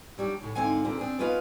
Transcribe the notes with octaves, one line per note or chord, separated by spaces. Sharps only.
F#3 G3 D4
A2 C#3
G#2 D3 F3 C4 F5 G#5
G2 A#2 D3 C4
C4 D4 G#4
B3 C#4 F4 B4 D#5 F5